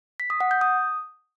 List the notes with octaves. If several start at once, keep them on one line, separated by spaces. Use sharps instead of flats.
B6
D#6
F#5
G6
D#6